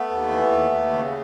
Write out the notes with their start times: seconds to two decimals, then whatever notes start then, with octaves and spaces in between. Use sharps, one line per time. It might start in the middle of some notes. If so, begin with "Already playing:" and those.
Already playing: A3 B3
0.10 D#2
0.31 E3
0.52 D#2
0.72 D#2
0.93 C#3